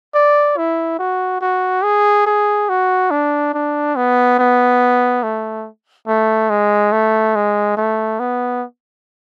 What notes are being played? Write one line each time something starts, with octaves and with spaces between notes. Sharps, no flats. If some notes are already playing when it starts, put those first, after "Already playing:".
D5
E4
F#4
F#4
G#4
G#4
F#4
D4
D4
B3
B3
A3
A3
G#3
A3
G#3
A3
B3